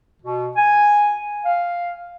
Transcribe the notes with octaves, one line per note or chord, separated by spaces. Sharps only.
B2
G#5
F5